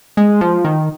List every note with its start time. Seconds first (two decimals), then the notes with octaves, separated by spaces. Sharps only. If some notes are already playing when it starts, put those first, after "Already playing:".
0.17 G#3
0.41 F3
0.65 D#3